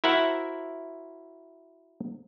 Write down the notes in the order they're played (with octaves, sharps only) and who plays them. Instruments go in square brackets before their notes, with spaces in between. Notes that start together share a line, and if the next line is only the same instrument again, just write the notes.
[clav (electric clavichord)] E4 F#4 A#4 C5 E5 F#5